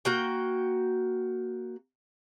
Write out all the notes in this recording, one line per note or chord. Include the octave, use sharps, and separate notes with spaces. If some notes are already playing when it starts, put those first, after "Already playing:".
A#3 F#4 G5